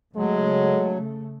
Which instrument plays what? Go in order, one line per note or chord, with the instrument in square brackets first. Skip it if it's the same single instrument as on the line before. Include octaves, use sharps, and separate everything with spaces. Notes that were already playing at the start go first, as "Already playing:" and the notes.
[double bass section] C#3 A3 [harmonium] F#3 [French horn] G#3